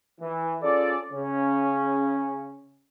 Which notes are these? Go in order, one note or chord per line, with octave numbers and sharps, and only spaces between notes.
E3
C#4 F4 G#4 A4 D5
C#3 C#4